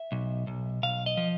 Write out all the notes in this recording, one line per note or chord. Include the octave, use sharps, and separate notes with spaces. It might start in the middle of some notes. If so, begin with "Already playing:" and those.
Already playing: E5
B1
B1
B1 F5
D#5
F3